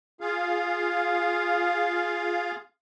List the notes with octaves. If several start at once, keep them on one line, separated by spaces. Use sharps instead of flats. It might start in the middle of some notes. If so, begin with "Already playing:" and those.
F4 G#4 F5